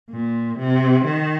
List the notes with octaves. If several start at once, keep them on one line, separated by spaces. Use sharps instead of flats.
A#2
C3
D#3